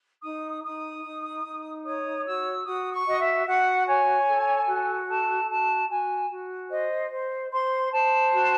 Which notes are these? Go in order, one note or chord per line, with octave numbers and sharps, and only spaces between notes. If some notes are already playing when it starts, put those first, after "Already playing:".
D#4 D#6
D#4 D#6
D#4
D#4
C#5 D#6
F#4 E6
F#4 D#6
C#6
F#4 D#5
E5
F#4 F#5
C#5 G#5
A4
F#4
A4 A5
F#4 A5
F#4 G#5
F#4
C5 D#5
C5
C5 C6
C5 A5
F#4